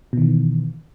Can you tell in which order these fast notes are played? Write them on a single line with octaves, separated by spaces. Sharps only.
B2 D#3 E3